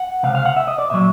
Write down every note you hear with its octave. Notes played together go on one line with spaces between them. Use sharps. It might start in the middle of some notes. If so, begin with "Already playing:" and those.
Already playing: F#5
C#2 C3 F5
F5
F#5
E5
D#5
D5
A#2 F#3 E5